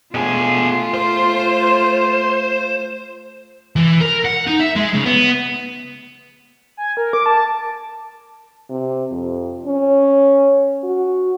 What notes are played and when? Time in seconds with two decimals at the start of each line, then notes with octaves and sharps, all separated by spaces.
0.15 B2 A3 F4 G#4
0.94 C5 C6
3.76 E3
4.00 A#4
4.25 F#5
4.47 D#4
4.60 E5
4.76 G#3
4.94 C#3
5.06 B3
6.77 G#5
6.97 A#4
7.13 D6
7.26 A5
8.69 C3
9.12 F2
9.66 C#4
10.84 F#4